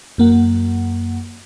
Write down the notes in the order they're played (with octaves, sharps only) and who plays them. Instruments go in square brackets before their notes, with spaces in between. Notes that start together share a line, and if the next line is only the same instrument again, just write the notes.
[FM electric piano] F#2 A#3 F#5